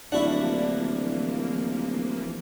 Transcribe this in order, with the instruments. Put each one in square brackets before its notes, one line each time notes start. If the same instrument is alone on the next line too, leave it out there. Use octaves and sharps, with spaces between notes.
[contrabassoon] D1 [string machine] E3 F3 A#3 [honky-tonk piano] D4 [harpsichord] E4 F#4 F#5